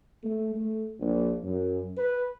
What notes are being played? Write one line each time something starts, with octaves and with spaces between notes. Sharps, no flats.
A3
A3
A#1
F#2
B4